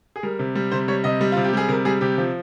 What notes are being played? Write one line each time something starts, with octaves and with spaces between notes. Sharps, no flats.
G#4
G3 A#4
C3
G3
C3 C5
G3 C#5
C3 D#5
G3
C3 F4
G4
G3 G#4
C3 A#4
G3 G#4
C3 G4
F3